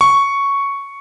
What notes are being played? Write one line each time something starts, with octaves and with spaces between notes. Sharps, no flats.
C#6